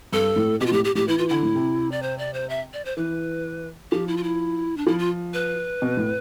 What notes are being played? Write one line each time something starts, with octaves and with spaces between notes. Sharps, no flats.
G2 A4
A2
B2 G4
F4
A2 G4
G4
A2 G4
E3 E4
E3 F4
D3 E4
A2
C3
D5
C5
D5
C5
E5
D5
C5
E3 B4
F3 G4
E4
F4
E4
D4
F3 E4
F4
B4
B2
A2